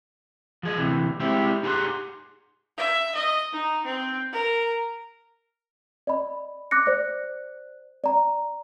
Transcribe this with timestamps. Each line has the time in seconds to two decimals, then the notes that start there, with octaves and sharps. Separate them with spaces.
0.63 F3 G#4 D#5
0.78 D2 C3 E3
1.20 G#3 C4 E4 G4
1.63 D#4 G4 G#4 A#4 F#5 C6
2.78 E5
3.15 D#5
3.53 D#4
3.86 C4
4.33 A#4
6.07 D5 D#5 B5
6.71 D6 F#6 A#6 C#7
6.86 C5 D5 F#6
8.04 D5 A#5